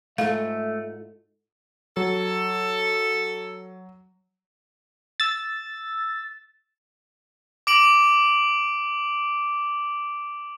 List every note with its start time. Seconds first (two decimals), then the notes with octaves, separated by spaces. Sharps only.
0.18 G#2 A3 F4 A4 E5 F5
1.97 F#3 A4
5.20 E6 A6
7.67 D6 D7 F#7